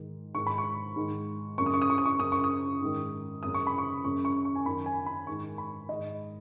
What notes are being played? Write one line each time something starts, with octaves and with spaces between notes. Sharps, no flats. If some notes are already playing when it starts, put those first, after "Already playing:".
Already playing: G#2 D#3
G#2 D#3 C#6
B5
C#6
G#2 D#3
F#2 C#3 C#6
D#6
C#6
D#6
C#6
D#6
C#6
F#2 C#3 D#6
C#6
D#6
G#2 D#3
F#2 C#3 D#6
C#6
B5
C#6
F#2 C#3 C#6
C#6
C#6
G#5
F#2 D#3 B5
G#5
B5
G#2 D#3 C#6
B5
G#2 D#3 D#5